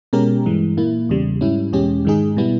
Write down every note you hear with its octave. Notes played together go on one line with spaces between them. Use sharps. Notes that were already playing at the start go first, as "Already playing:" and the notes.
B2 G#3 C#4 G4 A#4
G2 E3 G#3
A#2 A#3 E4
E2 C#3 G3
G#2 G3 C#4 E4
E2 B2 G#3 C#4 G4
G#2 D#3 G#3 D#4 G#4
B2 G3 B3 E4